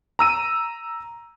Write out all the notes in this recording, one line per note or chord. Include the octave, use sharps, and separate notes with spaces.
A#5 E6 D#7